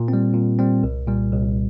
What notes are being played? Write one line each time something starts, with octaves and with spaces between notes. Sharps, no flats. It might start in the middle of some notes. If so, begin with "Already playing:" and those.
Already playing: A#2
C4
G3
A#2
G3 C4
C2
A#2 G3
C2